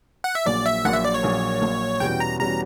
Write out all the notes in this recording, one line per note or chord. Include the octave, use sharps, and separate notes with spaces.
F#5
E5
A#1 A#2 F#3 D5
E5
A#1 A#2 F#3 F#5
E5
D5
C#5
A#1 A#2 F#3
A#1 A#2 F#3
E2 B2 G3 C#4 F#4 G5
A#5
E2 B2 G3 C#4 F#4 A#5